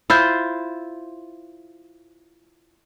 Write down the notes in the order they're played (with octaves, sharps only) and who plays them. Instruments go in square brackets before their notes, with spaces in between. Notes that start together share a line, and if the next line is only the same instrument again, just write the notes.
[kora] E4 F4 C5